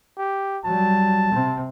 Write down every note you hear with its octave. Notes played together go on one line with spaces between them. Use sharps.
G4
F#3 G3 A5
C3 C4